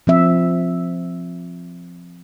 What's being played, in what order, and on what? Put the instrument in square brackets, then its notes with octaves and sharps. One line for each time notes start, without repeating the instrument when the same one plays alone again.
[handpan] F3 C4 E5